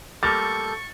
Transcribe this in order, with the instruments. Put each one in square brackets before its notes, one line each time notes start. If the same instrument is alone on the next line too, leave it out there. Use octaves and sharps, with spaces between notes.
[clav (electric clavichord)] G3 A3 A#3 [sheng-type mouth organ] A4 G6 [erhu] C#6 [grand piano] A6